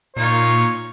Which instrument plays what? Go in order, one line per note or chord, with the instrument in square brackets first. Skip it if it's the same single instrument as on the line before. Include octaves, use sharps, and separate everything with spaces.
[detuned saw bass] A#2 [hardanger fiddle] D#4 F4 [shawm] C#5